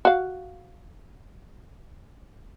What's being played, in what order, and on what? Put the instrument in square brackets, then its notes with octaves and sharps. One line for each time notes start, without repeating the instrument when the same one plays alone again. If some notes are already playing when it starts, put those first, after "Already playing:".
[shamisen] F#4 F5